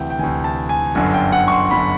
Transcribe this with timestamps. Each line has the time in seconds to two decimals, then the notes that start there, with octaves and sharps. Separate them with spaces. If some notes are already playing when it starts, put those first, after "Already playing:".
Already playing: D2 C3 E3 E5 F#5 G5
0.10 G5
0.19 D2 C3 E3 G#5
0.44 A5
0.69 G#5
0.95 G1 F#2 D3 G#5
1.14 G5
1.32 F#5
1.48 C#6
1.52 C6
1.71 G1 F#2 D3 B5